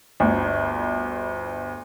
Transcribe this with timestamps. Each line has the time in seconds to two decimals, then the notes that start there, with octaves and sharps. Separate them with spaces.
0.20 G1 D2